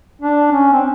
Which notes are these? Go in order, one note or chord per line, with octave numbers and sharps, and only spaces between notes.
D4
C#4
C4